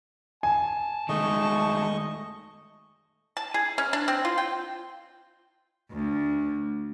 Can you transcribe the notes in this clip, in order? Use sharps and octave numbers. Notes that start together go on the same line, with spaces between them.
G#5 A5
D#3 G#3 A3 D#5 C#6
A5
G#4
C#4
D4
C4
F4
G5
D2